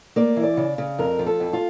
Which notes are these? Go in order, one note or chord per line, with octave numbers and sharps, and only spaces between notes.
A#3 D5
E3
D5
C#3
C#3
F2 A#4
F3
A4
F2
F4